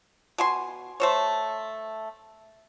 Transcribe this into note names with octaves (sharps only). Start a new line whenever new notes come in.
B2 G#5 C6
A3 C5 C#5